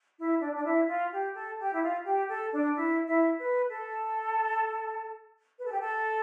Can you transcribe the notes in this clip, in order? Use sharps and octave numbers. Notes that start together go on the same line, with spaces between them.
E4
D4
D4
E4
F4
G4
A4
G4
E4
F4
G4
A4
D4
E4
E4
B4
A4
B4
A4
G4
A4